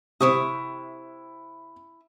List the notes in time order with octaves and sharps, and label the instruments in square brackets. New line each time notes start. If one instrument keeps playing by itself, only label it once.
[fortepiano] C3 C4 [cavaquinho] E4 C#6 D#6